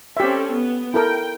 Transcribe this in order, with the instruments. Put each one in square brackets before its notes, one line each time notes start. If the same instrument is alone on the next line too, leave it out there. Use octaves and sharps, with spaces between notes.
[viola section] C4 C#4 A4 [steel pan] G4 E5
[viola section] B3
[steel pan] E4 A4 A#4 [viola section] G5